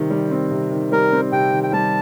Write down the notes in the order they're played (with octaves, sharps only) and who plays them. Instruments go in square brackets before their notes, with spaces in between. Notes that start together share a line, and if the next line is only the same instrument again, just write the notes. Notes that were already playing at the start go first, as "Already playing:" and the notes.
Already playing: [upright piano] C3 D#3 G3 C4
G3
C4
C3
D#3
[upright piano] G3 [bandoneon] A#4
[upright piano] C4
[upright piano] C3 [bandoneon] G5
[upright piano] D#3
[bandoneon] G5
[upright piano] G3 [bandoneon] A5